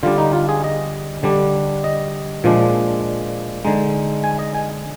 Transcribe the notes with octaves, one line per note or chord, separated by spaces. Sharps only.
D3 G3 D4 F4
D#4
F4
G#4
D#5
D3 G3 D4
D#5
A#2 F3 G#3 D4
D3 G#3 D#4
G#5
D#5
G#5